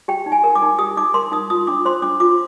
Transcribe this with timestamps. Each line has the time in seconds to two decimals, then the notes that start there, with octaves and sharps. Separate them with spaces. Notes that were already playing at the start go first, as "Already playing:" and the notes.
0.08 G4 G5
0.26 D#4
0.32 G#5
0.44 A#4
0.55 D6
0.62 D#4
0.79 G4 D#6
0.97 D#4 D6
1.14 A#4 C6
1.32 D#4 D#6
1.50 F4 D#6
1.67 D4 D6
1.85 C5 C6
2.02 D4 D6
2.20 F4 D6